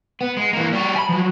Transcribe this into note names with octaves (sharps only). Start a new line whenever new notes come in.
B3
G#3
E3 A#3
G3 F#4
G#5 B5
F3 F#3